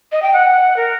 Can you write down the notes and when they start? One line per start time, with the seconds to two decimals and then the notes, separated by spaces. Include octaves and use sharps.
0.12 D#5
0.22 G5
0.33 F#5
0.77 A#4